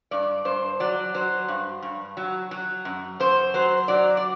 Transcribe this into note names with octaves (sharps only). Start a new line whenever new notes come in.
G2 D5
G2 C5
F#3 D5
F#3 C5
G2
G2
F#3
F#3
F#2
F#2 C5
F#3 C5
F#3 D5
D5